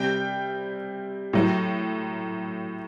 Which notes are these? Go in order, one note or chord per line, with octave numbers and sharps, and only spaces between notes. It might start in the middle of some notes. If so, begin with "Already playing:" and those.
Already playing: C3 G3 G5
A2 F#3